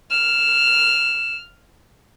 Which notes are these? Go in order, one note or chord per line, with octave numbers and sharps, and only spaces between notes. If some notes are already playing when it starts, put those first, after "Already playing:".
F6 E7